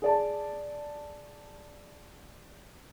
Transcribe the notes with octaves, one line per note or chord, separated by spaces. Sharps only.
G#4 D5 A5